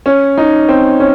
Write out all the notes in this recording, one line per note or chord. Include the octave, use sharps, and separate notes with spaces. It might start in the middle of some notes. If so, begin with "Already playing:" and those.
C#4
D#4
C4
C#4